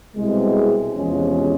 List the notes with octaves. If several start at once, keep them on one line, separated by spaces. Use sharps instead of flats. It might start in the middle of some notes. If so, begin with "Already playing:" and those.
C2 B2 G#3 C4 E4
E2 C3 F3 G#3 C#4